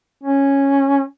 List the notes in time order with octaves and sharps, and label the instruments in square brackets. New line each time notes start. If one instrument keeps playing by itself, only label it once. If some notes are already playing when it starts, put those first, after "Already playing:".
[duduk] C#4